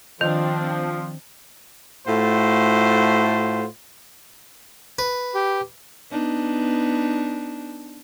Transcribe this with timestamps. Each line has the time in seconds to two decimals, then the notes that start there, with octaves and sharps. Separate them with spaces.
0.21 D#3 F3 C4 D4
2.07 A2 A3 F4 F#4 C5
4.99 B4
5.35 G4
6.11 B3 D4 D#4